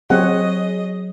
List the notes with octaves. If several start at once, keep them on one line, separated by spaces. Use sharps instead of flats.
F#3 C4 G4 G#4 C#5 D#5 F#5